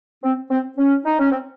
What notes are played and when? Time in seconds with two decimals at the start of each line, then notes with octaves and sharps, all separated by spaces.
0.24 C4
0.51 C4
0.77 C#4
1.05 D#4
1.19 C#4
1.31 C4